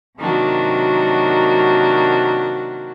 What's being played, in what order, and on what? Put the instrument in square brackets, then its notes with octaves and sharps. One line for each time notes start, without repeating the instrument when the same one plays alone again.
[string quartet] C3 D#3 F#3 A#3 D4 F#4